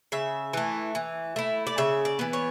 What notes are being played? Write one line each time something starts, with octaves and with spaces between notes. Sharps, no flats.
C#3 E5
E3 A3
E3
A3 E4
D5
C#3 E5
D5
E3 B3
C#5